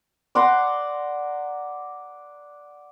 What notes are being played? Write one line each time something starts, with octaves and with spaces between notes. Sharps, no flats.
D5 F#5 A#5 C6